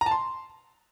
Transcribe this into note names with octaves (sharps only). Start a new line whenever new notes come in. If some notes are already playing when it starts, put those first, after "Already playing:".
A#5
A5
C6